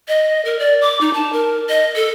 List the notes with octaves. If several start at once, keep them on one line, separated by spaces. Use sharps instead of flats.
D#5
A#4
D5
D6
D#4
A5
A#4
D#5
A4